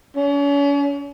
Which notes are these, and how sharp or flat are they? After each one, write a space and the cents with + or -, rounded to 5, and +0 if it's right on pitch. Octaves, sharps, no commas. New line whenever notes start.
C#4 +40